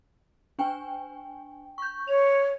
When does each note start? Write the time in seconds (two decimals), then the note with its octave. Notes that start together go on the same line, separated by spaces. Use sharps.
0.59 D4 G5 G#5
1.78 C#6 G6
2.08 C#5 F7